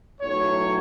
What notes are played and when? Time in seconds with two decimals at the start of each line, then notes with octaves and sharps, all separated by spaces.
0.21 B1 A2 F#3 C#5